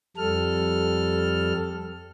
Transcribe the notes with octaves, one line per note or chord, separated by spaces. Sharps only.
F2 G3 A4 F6